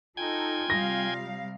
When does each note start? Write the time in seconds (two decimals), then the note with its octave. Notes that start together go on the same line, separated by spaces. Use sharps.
0.17 D#4 F4 A4 G5 G#5 G#6
0.70 C3 G3 F5 A#6